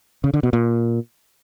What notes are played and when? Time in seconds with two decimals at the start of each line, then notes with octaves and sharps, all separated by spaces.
0.24 C#3
0.34 D3
0.43 B2
0.53 A#2